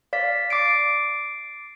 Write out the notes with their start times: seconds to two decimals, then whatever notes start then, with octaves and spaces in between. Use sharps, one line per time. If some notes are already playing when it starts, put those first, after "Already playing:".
0.13 D5 F5 B6
0.50 D6 A6 C7 D7